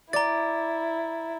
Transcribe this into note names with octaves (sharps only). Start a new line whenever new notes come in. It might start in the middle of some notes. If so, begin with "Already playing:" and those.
E4 D5 A#5 A6